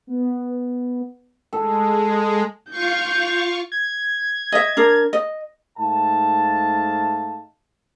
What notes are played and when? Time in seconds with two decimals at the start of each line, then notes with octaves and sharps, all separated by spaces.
0.07 B3
1.53 G#3 A4
2.70 F4 F5 C#6 G6
3.72 G#6
4.52 D#5 E5
4.77 D4 A#4
5.13 D#5
5.78 G#2 A3 D#4 F5 A5